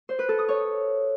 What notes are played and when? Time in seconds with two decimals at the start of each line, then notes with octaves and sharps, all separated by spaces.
0.09 C5
0.19 B4
0.29 A4
0.39 D#6
0.49 C#5